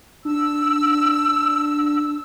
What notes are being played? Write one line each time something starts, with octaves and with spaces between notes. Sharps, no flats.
D4 E6